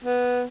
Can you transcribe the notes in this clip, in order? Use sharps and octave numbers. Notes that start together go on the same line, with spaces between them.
B3